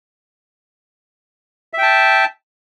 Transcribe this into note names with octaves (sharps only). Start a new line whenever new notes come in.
E5 G5 A5